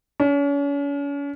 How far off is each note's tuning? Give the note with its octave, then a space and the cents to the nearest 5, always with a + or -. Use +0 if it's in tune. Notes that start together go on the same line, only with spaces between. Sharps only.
C#4 +40